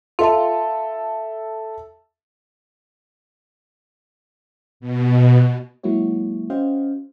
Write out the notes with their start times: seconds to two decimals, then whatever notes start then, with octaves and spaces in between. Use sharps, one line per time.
0.19 F4 A4 E5 A5
4.80 B2
5.83 F#3 G#3 A#3 E4 F#4 C#5
6.50 C#4 F#4 C5 D#5 F5 G5